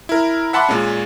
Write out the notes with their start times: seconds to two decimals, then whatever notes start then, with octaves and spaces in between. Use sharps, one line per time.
0.09 E4 A#4
0.53 E5 F#5 A5 B5 C6 D6
0.69 A#2 G#3 C#4